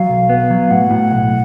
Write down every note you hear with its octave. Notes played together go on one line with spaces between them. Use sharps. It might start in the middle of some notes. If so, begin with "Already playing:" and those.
Already playing: F#3 F5
B1
B3
F#3
A2 F#5
A2
B1